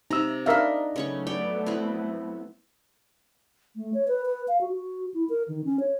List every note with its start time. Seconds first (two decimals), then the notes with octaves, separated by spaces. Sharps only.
0.11 C3 D#4 A#5 E6
0.46 D4 D#4 A#4 E5 F5
0.96 C#3 F#3 A3 B3 C#4 C#6
1.27 C#5 D5 G5
1.66 C4 E4 B4
3.76 A3
3.94 C#5
4.08 B4
4.26 B4
4.48 F5
4.61 F#4
4.73 F#4
5.14 E4
5.29 A#4
5.48 D#3
5.65 C#4
5.80 C#5